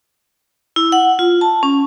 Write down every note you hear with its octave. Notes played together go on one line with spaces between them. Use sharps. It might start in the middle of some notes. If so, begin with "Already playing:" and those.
E4
F#5
F4
A5
C#4